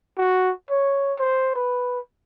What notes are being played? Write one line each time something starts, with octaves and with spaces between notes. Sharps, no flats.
F#4
C#5
C5
B4